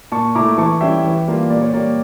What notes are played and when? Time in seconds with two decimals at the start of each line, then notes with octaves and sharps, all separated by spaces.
0.12 A#2 A5 C#6
0.35 A3 E4 A#5 D6
0.58 E3 A5 C#6
0.81 G3 C#4 E4 E5 G5
1.05 E3
1.28 G3 A#3 D4 F4
1.50 A#2 D5
1.62 C#5
1.74 G3 A#3 D5